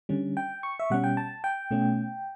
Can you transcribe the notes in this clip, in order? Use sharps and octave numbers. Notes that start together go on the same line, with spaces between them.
D3 G3 C#4
G5
C#6
E5
B2 G3 C#4 F#5
G5
A5
G5
B2 A3 C#4